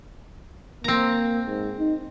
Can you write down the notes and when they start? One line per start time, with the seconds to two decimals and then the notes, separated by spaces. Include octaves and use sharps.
0.84 A#3 C4 A#5
1.47 G#2
1.79 D#4